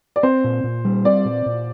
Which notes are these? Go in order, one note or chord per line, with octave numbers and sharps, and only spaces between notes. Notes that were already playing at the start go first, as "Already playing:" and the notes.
D5
C4 C5
A#2
A#2
G3
C4 D5
A#2
A#2